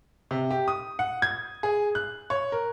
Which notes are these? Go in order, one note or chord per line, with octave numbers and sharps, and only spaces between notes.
C3
G4
D#6
F#5
G#6
G#4
F#6
C#5
A#4